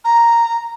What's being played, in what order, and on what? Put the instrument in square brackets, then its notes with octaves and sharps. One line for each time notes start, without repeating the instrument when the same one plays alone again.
[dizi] A#5